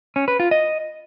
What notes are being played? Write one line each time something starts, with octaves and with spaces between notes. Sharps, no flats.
C#4
B4
F4
D#5